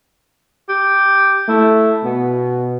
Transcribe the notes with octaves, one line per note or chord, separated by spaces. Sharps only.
G4
A3 E4
B2 B3